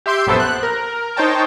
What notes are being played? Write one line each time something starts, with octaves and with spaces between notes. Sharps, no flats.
G4 E5 C6 G6 D7
A#1 F#2 B3 A4 C5 E5
F#6
A#4
D#4 C5 C#5 G5 A5